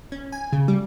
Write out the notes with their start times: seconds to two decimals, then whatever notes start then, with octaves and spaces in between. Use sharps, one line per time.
0.12 C#4
0.32 G#5
0.53 C#3
0.68 G3